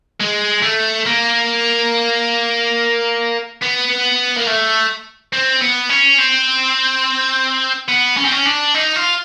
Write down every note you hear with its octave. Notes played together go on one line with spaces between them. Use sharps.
G#3
A3
A#3
B3
A#3
A3
C4
B3
C#4
C4
B3
C#4
C4
C#4
D4
D#4
F4